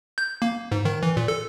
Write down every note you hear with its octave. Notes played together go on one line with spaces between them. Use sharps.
G6
A#3
G#2
D#3
E3
A#2
A4